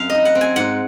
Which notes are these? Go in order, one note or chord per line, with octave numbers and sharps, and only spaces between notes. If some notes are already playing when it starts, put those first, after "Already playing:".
Already playing: F#2 C4 F5
D#4 D#5
F#5
C4
G#5
G#2 F#5